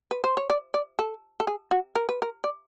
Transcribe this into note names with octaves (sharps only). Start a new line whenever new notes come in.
B4
C5
C#5
D5
D5
A4
A4
G#4
F#4
A#4
B4
A#4
D5